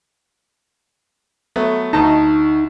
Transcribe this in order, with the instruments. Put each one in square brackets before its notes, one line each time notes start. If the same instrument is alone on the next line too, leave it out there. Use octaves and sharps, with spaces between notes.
[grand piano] F#3 A3 B3
[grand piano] D2 A5 [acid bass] D#4